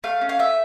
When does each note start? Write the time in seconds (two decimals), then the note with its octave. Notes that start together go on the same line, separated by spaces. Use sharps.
0.04 A3 F5
0.21 C#4
0.29 F5
0.39 A3 E5